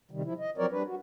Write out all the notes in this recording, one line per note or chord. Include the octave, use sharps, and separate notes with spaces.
C3 D#3 G3
F3 E4
D#5
F3 F#3 C4 A#4 C#5 D5
G3 D4 B4
F#4